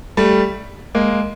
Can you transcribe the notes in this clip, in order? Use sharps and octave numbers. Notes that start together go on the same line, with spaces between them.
G3 A3
G#3 A#3